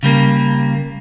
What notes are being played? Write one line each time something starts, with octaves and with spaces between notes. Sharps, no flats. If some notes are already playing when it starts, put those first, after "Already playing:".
C#3 G3 A#3